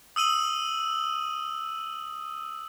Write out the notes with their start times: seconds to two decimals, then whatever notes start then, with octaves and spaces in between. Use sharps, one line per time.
0.16 D#6 E6 D#7 F#7